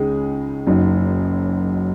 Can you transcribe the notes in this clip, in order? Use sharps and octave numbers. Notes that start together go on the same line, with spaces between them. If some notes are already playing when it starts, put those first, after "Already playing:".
Already playing: C#2 C#3 G#3 D#4 G#4
F#1 F#2 F#3 D#4